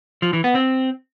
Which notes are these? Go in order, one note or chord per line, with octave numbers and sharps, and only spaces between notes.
F3
E3
B3
C4